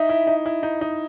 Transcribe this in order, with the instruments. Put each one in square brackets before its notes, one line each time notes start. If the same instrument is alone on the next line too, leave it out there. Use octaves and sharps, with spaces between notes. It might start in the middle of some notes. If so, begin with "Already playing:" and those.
Already playing: [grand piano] D#4 [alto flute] E5
[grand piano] E4
D#4
E4
D#4
D#4